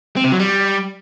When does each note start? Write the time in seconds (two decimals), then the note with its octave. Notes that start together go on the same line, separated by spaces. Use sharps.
0.16 C4
0.24 C3
0.32 F#3
0.39 G3